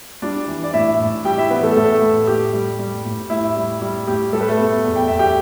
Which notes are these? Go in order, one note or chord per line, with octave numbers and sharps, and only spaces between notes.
G3 D4 D5
E3
D5
A2 E4 E5
A2
G3 G4 G5
E4 E5
E3 B3 B4
A3 A4
A2 A3 A4
A2
A2 G4
G3
G3
A2
A2 E4
G3
G3
A2 G4
G3 A4
B4
A3 A4
B2
E2
G5
E2 E5
G4 G5